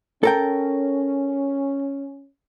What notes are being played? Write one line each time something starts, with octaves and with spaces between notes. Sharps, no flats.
C#4 A4 A#4 G5